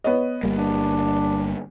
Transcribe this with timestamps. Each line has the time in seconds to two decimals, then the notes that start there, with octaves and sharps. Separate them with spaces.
0.04 B3 C#5 D#5
0.43 G1 G3 A#3
0.58 D4